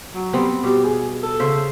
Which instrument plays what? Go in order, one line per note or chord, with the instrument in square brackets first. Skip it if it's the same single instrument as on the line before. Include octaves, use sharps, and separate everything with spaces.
[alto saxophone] F#3
[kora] G3 B3 C4
[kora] B2 [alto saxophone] G4
[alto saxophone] G#4
A4
[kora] C#3 C5 E5